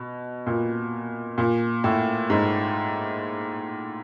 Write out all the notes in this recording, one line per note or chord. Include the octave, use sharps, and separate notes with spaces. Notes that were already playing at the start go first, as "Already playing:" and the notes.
Already playing: B2
A#2
A#2
A2
G#2